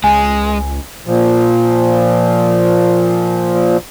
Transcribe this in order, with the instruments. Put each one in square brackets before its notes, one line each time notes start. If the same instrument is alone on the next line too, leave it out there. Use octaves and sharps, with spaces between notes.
[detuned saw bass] C#2 [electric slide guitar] G#3 [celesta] G#5
[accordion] A#2 F3